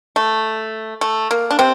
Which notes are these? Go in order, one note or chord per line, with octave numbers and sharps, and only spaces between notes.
A3
A3
A#3
D4
C3 C4